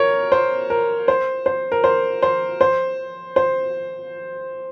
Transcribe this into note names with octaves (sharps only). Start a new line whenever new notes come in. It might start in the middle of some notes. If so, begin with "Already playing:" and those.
Already playing: A#4 C#5
C5
A#4
C5
C5
A#4
C5
C5
C5
C5